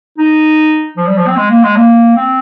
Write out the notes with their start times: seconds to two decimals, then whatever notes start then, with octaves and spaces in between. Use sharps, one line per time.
0.19 D#4
0.97 F3
1.07 G3
1.18 F3
1.27 C4
1.37 G#3
1.50 A#3
1.63 G#3
1.77 A#3
2.16 C4